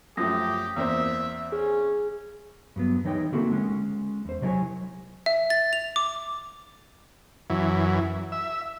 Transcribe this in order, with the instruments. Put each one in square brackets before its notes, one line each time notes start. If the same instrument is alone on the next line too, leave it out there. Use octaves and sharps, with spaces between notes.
[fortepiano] F#2 F3 A3 [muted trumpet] G4 [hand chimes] D#6 A#6
[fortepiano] E2 A#3 C4 [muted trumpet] E5
[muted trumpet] C#4 [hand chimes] G#4
[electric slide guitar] G2 F#3 B3
E3 D#4 C#5 G5
D3 A3 A#3 C4 E4 F#4
G#3 C#4
E2 C5
C3 F#3 D4 E4 C#5 G#5
[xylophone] E5
A6
F7
D6
[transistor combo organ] F#2 E3
E5